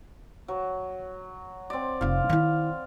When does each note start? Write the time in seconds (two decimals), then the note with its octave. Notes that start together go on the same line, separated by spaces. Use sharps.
0.48 F#3
1.70 C4 D5
2.01 F1 F4 F5
2.29 D#3 E4